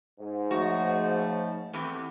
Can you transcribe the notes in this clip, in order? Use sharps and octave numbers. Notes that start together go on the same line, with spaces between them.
G#2
C#3 F3 A3 F#4
E2 E3 A3 B3 C4 G4